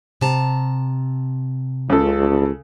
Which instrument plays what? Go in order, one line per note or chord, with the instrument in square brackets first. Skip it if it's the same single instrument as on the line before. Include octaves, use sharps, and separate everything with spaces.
[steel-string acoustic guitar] C3 A5 A#5
[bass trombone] C#2 [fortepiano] C#3 A4